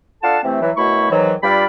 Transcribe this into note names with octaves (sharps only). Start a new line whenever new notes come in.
D4 F4 A4 F5 F#5 A5
C3 E3 A3 C4
E3 F#3
F#2 B2 A3 E4 B5 C#6
G#2 D#3 E3 F#3
G2 G3 F4 D5 F5 B5